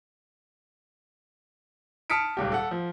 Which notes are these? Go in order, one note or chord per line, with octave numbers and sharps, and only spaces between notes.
A5 D#6 F6 B6 C#7 D7
D#1 C#2 G4
A4 F#5
F3